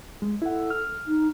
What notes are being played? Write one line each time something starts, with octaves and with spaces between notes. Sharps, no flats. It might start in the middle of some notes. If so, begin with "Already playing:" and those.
G#3
E4 A4 F#5
F6
D#4